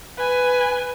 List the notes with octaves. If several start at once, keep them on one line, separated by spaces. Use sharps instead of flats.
B4 G#5